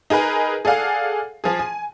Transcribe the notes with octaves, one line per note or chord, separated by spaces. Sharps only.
D#4 G#4 A#4 B4
G#4 A4 D5 F5 F#5
F3 G#4
G#5